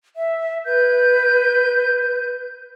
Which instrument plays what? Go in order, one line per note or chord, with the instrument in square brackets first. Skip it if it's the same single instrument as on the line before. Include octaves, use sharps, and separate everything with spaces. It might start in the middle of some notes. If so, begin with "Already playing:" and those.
[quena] E5
[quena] B4 [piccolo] G6